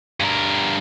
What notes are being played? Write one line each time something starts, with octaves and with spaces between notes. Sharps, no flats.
G2 A#4